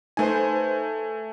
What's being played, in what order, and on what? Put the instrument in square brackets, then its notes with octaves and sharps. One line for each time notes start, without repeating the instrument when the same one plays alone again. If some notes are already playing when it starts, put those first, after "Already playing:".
[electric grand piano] A3 G#5 [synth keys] D#4 B4 C5